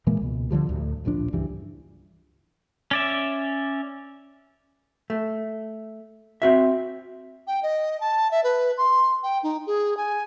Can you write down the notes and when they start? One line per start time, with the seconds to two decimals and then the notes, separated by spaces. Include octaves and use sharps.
0.07 A#2 E3 G#3 A#3
0.21 C#2 B2
0.50 D2 D3 F3 G3
0.69 D2 A2
1.05 D1 A#1 F3 D4
1.33 C#2 G2 E3 G3
2.91 C#4 D5 E5
5.10 A3
6.42 C4 F#4 E5
7.47 G5
7.63 D#5
8.01 A5
8.31 E5
8.44 B4
8.78 C6
9.23 G5
9.43 D#4
9.67 G#4
9.97 G#5